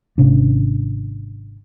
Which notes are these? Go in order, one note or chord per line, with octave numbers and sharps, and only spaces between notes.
G#1 C3 C#4 D4